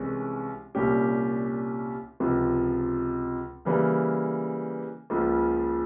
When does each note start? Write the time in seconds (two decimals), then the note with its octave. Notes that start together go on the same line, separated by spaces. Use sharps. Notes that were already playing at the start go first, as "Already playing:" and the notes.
Already playing: C2 C3 E3 G#3 C#4
0.75 C2 A#2 G3 C#4 G4
2.20 C#2 C3 F3
3.65 C#3 E3 G3 A#3
5.10 C#2 C#3 F3 A#3